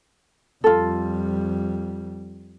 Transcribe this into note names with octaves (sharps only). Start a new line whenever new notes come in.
F2 G3 F4 A4